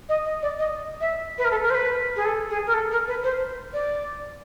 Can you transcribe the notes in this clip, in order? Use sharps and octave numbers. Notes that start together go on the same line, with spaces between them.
D#5
D#5
D5
D#5
E5
B4
A#4
A4
A#4
C5
B4
G#4
A4
G#4
A#4
A4
A#4
B4
C5
D5